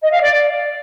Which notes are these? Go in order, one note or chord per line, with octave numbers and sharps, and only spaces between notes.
D#5
F5
D5